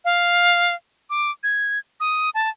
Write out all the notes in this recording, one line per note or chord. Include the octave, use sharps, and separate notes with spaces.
F5
D6
G#6
D#6
A5